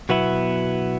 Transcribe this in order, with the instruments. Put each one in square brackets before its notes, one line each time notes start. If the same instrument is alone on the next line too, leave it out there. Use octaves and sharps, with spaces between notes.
[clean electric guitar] B2 F#3 B3 E4